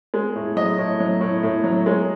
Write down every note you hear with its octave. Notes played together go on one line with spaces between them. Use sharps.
G#3
A2
F#3 D#5
A2
F#3
A2
A2
F#3
G#3